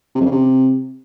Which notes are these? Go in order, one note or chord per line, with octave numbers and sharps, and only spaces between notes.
C3
F2
C#3
C3